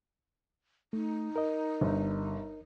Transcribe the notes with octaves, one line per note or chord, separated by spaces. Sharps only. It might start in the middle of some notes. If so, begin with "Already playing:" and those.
A3 D#4
A#4 D#5
G1